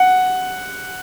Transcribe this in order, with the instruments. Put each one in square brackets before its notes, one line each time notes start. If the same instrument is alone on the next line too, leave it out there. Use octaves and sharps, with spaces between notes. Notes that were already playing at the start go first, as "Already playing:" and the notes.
Already playing: [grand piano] F#5